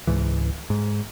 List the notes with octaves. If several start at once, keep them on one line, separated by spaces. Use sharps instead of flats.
C#2 G#2 E3
G#2